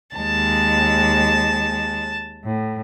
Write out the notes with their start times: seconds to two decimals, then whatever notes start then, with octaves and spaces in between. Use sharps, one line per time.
0.16 D#2 G#3 A5
2.45 A2